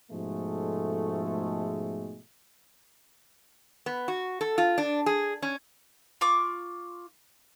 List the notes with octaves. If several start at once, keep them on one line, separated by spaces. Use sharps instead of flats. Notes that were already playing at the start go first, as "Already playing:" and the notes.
G#2 B2 F3 G#3 A3
B3
F#4
A4
F4
D4
G#4
C#4
F4 C#6 D6